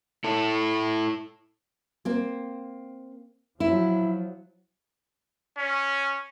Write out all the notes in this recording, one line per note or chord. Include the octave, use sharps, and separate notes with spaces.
E4 A4
A#3 C4
F3 F#3 E4
C#4